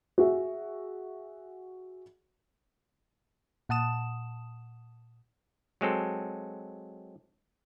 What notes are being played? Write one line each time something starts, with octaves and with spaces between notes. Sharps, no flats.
F#4 G#4 E5
A#2 F#5 A5 D#6 E7
F#3 G#3 C4 A4